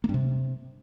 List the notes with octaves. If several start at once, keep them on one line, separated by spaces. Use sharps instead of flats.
A#3
G2
C3